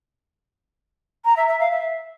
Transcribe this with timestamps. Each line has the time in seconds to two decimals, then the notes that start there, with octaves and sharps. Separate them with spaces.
1.25 A#5
1.36 E5
1.48 E5
1.60 F5
1.71 E5